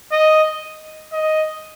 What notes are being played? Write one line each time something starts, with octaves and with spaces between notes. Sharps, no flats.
D#5
D#5